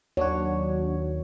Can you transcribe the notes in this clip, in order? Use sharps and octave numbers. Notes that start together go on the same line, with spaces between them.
D#2 F#3 D4 F#4 C#5